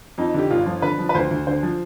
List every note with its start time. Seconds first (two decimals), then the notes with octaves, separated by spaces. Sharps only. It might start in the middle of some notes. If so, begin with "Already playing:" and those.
0.18 F2 D#4
0.34 D3 G4
0.51 G1 F4
0.66 F3
0.82 D3 B4
0.99 F3
1.09 B4
1.15 D2 C5
1.31 D2
1.47 D3 C5
1.63 F3